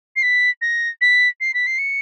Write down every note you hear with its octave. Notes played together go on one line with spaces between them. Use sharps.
C7
B6
A#6
B6
C7
B6
C7
C#7